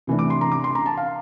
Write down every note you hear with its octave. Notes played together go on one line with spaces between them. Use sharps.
C3 E3 A3 D4
D6
C6
A#5
D6
C6
A#5
A5
F5